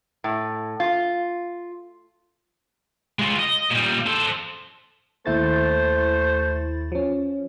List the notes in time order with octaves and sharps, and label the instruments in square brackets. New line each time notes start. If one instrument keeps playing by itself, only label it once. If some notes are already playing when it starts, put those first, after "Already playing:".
[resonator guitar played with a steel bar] A2
F4
[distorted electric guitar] G#3 F4
D#5
A#2 G3
A4 C5
[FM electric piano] D#2 E4 A6 [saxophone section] A3 C5
[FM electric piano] F3 C#4